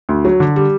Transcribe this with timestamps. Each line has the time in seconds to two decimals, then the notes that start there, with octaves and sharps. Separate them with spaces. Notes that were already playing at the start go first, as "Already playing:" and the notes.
0.09 D2
0.25 F#3
0.40 D3
0.56 G3